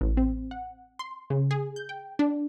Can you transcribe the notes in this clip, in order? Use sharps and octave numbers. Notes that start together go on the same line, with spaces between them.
A1
C4
F#5
C6
C#3
G#4
G6
G5
D4